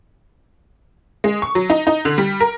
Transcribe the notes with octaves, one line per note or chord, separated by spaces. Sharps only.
G#3
C#6
F#3
D#4
D#4
D3
G3
A#4